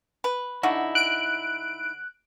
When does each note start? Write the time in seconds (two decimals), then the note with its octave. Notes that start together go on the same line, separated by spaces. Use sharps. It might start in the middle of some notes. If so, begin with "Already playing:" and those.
0.24 B4
0.63 D3 D#4 E4 F#4
0.95 F#6 D7